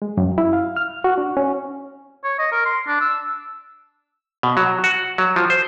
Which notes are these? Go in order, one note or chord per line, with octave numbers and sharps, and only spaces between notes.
G#3
F#2
E4
F5
F6
F#4
D4
C#4
C#5
D#5
A#4
C6
D4
E6
B2
F#3
F#4
F#3
F3
C5